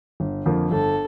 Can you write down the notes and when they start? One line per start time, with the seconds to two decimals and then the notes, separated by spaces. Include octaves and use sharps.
0.20 G1
0.46 F2 D3 F3 A#3
0.71 G1 A4